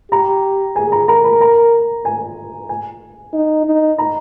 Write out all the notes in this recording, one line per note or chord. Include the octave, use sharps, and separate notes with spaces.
G4 A#5
G#4 G#5
A#5
A#4 A#5
B5
A#5
G#5
G#5
D#4
D#4
A#5